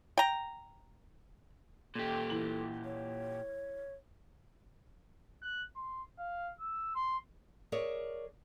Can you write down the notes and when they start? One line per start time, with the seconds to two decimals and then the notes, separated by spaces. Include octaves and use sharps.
0.18 G5 A#5
1.95 A#2 G4 A4
2.30 E3 F#7
2.85 C#5
5.42 F#6
5.76 C6
6.19 F5
6.60 E6
6.95 C6
7.72 G#4 A#4 C#5 D5 E5